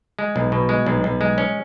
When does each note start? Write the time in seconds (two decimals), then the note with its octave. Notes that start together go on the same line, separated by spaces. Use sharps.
0.19 G#3
0.36 B1
0.52 B2
0.69 G#3
0.86 B1
1.04 B1
1.21 G#3
1.38 C#4